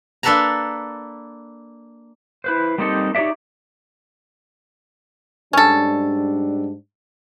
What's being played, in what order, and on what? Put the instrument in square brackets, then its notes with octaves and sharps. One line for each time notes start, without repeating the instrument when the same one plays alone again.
[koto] A#3 D4 A4 B4 A5 A#5
[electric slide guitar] E4 B4 C5
G3 A#3 C4 D#4 G4 A4
D#4 G4 C#5 D5 E5
[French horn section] G#2 G3 D4 [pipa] C#4 A4